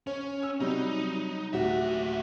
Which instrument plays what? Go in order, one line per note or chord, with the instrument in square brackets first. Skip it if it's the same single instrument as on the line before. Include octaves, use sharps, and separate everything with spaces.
[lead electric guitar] C#4 [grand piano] C#5
[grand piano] E6
[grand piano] C3 F#3 G3 [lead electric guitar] D#4
[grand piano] D1 F#4 G4 [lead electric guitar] D#2 E5